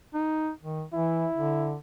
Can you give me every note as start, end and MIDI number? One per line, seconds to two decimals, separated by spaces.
0.14 0.50 63
0.62 0.83 51
0.94 1.26 52
0.94 1.74 64
1.33 1.76 50